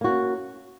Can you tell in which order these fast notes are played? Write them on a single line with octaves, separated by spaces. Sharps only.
A#3 F#4 C#4